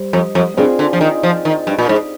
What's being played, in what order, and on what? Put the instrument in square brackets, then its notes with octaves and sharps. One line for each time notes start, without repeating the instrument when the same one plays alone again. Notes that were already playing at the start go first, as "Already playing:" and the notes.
Already playing: [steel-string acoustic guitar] G3 C5
[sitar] F2
F2
[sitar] G2 [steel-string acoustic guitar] C4 F4 G#4 D5
[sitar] D3
F3
D#3
F3
D#3
G2
A#2
G#2